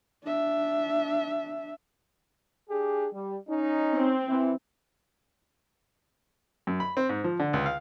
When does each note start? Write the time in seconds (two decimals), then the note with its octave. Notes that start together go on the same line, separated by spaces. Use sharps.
0.23 D4 E5
2.70 D4 G4 G#4
3.13 G3
3.49 C#4 D#4
3.93 C4
4.28 E3
6.67 F#2
6.80 B5
6.97 C4
7.09 G#2
7.24 F3
7.39 D3
7.53 C#2
7.66 F5